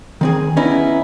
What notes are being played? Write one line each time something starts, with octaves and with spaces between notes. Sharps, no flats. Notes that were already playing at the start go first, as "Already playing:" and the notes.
D#3 C4 G#4
B3 C#4 D#4 E4